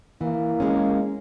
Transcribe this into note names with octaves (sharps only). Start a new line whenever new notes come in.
E3 A#3
G#3 C#4